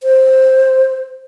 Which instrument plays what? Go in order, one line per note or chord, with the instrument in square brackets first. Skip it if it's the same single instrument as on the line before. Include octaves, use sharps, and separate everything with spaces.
[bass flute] C5